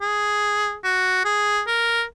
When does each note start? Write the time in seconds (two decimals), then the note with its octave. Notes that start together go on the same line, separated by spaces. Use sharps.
0.01 G#4
0.84 F#4
1.25 G#4
1.67 A#4